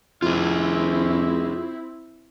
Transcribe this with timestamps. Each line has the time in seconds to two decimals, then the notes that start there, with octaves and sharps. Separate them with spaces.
0.22 F2 C4 E4 F4 G#4